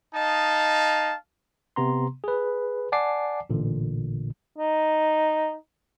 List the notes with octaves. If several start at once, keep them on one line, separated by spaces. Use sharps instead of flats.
D#4 D#5 F5 A5
C3 B3 A#5 C6
G#4 B4
D5 F#5 G#5 A5 D6 C7
A1 A#2 D3
D#4